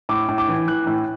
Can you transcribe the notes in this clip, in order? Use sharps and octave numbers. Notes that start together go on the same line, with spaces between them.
A2 D6
A2
D6
E3
E3 F#6
A2